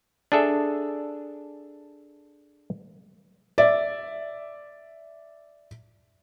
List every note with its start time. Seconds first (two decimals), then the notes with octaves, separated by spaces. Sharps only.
0.32 D4 G#4 A4 E5
3.58 D5 E5